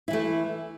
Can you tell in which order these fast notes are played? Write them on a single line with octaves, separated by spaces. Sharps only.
E4 E3 A3